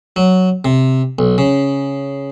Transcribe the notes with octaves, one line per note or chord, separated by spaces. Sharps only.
F#3
C3
B1
C#3